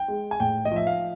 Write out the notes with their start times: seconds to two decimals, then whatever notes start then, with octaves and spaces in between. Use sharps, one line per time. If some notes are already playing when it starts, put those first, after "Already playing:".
Already playing: G5
0.08 G#3
0.31 G#5
0.40 A2 G5
0.65 D#5
0.71 F3 E5
0.87 F5